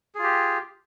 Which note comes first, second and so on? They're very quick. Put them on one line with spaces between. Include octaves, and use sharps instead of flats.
G#4 F4 G4